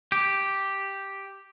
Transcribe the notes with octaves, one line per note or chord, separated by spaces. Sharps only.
G4